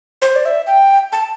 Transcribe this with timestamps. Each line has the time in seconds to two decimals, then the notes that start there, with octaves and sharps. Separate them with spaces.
0.22 C5
0.36 D5
0.45 E5
0.67 G5
1.12 A5